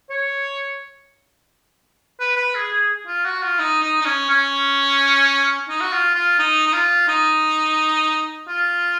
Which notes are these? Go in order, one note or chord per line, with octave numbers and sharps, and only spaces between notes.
C#5
B4
B4
G#4
G#4
F4
F#4
F4
D#4
D#4
D#4
C#4
C#4
D#4
F#4
F4
F4
D#4
D#4
F4
D#4
F4